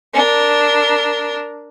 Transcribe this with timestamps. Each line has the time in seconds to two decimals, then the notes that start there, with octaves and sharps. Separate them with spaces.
0.14 D4 A#4